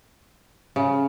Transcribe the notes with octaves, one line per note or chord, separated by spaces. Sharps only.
C#3